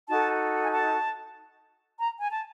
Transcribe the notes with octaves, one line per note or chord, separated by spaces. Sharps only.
D#4 F#4 A4 A5
G#5
A5
A#5
G#5
A5